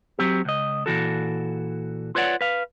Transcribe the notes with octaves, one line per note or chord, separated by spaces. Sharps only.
F#3 C4 G4
C#2 D#5
A#2 E3 F#4 A4
F4 B4 C#5 D5 F#5
B4 F5